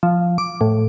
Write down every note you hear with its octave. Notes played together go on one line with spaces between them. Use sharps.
F3
D6
A2